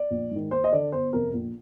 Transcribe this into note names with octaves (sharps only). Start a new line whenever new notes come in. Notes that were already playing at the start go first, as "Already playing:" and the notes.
Already playing: D5
A#1
G#2 D#3
D#2 C5
D#5
D3 D5
G1 C5
F2 C3 A#4
A#1